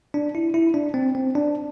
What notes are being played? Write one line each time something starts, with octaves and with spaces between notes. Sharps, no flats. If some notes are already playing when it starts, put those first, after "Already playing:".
D4
E4
E4
D4
C4
C4
D4